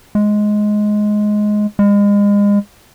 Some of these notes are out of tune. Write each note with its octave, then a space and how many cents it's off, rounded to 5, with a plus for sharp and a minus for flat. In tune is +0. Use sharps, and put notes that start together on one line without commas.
G#3 +10
G#3 -35